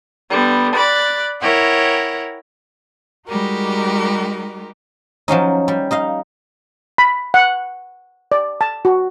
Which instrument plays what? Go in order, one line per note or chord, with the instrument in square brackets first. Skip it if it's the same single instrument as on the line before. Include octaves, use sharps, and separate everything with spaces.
[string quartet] D3 G3 B3
D5 B5 F#6 A6
E4 A#4 C#5 F#5 G5
G3 G#3 D#4 F#4 G4 A#4
[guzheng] F3 F#3 C#4 D#4
G3
D#4 D#5 F5
[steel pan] B5
F#5
D5
A5
F#4